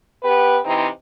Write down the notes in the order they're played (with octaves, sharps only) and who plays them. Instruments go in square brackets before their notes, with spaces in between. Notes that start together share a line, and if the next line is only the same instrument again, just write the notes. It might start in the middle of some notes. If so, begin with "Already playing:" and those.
[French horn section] B3 G4 B4
C3 E3 C4 D#4